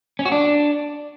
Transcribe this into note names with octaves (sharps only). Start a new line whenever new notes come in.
C#4
F#4
D4